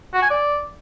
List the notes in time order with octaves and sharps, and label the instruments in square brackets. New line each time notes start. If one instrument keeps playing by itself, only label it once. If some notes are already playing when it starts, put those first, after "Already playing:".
[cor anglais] F#4
G#5
D5